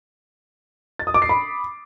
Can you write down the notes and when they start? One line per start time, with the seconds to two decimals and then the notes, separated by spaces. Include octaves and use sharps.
0.99 A6
1.07 D#6
1.14 D6
1.22 C7
1.29 B5